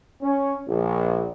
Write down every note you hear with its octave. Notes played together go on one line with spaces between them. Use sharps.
C#4
A#1